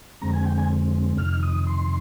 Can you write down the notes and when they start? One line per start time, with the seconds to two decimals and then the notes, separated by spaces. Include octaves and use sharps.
0.21 F2 D3 G#3 C4 A#5
0.34 G#5
0.46 G5
0.58 G#5
1.18 F2 C3 D#3 F6
1.43 D#6
1.67 C6